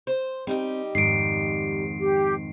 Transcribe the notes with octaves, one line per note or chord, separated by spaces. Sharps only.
C5
G3 C4 D#4 G4
F2 G#2 D#3 C7 D7
G4